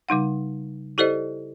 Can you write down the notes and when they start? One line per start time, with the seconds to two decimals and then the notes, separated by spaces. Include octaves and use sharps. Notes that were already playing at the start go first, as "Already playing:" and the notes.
0.09 C#3 G3 D#4 F#5
0.98 E4 G4 A4 C5 D5 D#5